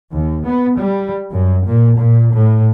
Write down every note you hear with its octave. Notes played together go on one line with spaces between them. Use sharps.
D#2
B3
G3
F#2
A#2
A#2
A2